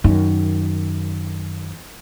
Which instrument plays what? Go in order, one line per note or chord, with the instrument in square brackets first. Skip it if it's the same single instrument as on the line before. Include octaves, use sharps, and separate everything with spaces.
[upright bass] F#2 D#3